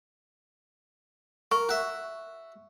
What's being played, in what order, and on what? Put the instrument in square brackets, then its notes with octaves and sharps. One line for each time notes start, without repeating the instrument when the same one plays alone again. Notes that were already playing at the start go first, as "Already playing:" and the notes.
[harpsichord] A#4 [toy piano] C#6
[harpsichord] F#4 E5